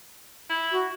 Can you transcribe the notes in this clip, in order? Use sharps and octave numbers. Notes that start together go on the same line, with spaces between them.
E4
F#4